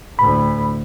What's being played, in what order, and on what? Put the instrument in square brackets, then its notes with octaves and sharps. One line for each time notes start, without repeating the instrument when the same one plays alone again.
[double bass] D2 A2 [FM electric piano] B5